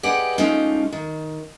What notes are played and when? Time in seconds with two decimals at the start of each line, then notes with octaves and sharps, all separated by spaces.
0.03 G4 G#4 B4 D5 D#5 F#5
0.38 G#3 A3 C#4 D#4 F4 G4
0.92 D#3